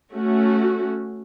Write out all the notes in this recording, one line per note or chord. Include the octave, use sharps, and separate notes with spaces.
A3 C#4 F#4